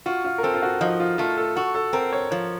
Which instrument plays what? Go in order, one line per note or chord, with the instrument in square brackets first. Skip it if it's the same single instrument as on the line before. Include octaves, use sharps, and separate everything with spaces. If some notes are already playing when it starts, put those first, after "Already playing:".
[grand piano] F4 [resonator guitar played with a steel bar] F#4
[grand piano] F4
A#4
[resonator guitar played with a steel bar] C4 [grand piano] A4
[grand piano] F4
F#4
[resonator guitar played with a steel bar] F3 [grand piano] D#4
[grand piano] F4
[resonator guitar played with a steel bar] A3 [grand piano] F4
[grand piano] A4
[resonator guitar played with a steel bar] F#4 [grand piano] A4
[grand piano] A4
[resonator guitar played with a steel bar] C4 [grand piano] A#4
[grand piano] C#5
[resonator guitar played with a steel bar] F3 [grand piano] C#5